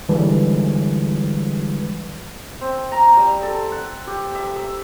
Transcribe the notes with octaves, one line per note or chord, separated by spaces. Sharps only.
D3 E3 G3 G#3 B4
C4
A#5
G3
A4
F#5
G4
E5
E6